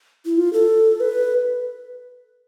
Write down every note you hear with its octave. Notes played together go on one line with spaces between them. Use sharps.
E4
F4
A4
B4